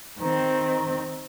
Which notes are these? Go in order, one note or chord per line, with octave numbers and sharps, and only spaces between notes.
D#3 C4